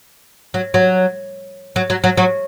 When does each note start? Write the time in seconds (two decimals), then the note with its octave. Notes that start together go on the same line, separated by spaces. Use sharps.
0.54 F#3
0.74 F#3
1.76 F#3
1.90 F#3
2.04 F#3
2.17 F#3